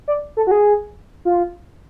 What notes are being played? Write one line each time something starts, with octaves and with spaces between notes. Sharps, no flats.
D5
A4
F#4
G#4
F4